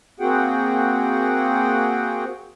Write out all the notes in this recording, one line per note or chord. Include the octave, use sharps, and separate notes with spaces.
A#3 C4 F#4 G#4 F#5 G5